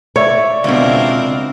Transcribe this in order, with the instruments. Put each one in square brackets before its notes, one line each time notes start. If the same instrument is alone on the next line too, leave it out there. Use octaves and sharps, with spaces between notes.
[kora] C#5 [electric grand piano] D5 E5
[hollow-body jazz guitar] C#2 B2 [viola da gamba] C4 D4 A#4